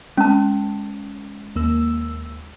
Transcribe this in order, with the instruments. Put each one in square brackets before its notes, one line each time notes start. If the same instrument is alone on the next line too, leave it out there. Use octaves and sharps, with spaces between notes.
[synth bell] G#3 [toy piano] C#4 A5
[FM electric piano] D#2 A#3 E6